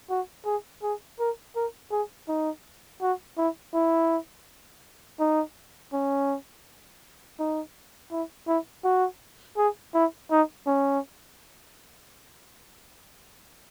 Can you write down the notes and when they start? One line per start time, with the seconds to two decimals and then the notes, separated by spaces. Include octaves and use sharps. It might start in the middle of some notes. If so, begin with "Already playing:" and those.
0.10 F#4
0.45 G#4
0.83 G#4
1.19 A#4
1.56 A#4
1.91 G#4
2.28 D#4
3.02 F#4
3.37 E4
3.74 E4
5.20 D#4
5.93 C#4
7.39 D#4
8.11 E4
8.48 E4
8.84 F#4
9.57 G#4
9.94 E4
10.31 D#4
10.66 C#4